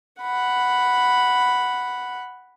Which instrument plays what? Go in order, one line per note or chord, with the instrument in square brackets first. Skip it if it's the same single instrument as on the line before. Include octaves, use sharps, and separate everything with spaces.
[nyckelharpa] F#5 B5